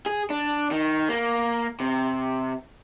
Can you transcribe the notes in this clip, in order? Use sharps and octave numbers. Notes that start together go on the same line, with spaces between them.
G#4
D4
D#3
A#3
C3